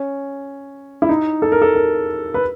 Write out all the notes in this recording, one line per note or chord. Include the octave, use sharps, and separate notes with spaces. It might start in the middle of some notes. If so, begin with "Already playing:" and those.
Already playing: C#4
E4
D#4
A4
A#4
A4
A#4
B4